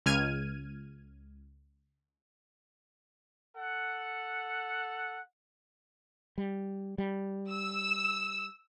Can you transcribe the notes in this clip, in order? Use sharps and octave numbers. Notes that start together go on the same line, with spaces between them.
C#2 F6 G#6 D#7
A4 F#5
G3
G3
E6